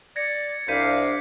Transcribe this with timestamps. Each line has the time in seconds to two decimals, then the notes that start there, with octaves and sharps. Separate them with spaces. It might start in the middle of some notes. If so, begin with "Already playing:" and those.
0.16 D5 G#6 A#6 C#7
0.68 C2 D4 F5 G6 B6 D#7